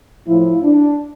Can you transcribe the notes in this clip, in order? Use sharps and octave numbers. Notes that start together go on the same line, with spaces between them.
A2 F3 E4
D4